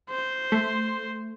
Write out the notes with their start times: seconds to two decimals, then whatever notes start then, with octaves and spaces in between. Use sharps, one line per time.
0.10 C5
0.52 A3